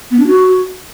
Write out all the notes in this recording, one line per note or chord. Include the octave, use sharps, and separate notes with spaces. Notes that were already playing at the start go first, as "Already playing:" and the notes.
B3
D4
F#4